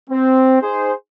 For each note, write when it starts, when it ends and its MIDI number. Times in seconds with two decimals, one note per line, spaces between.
0.10 0.57 60
0.61 0.92 63
0.61 0.92 68
0.61 0.92 72